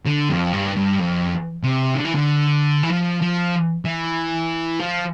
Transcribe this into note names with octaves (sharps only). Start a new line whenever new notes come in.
D3
F2
G2
G2
F2
C3
D3
E3
D3
E3
F3
F3
E3
F3